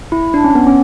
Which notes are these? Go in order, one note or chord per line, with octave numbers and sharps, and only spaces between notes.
E4
D4
C#4
B3
C#4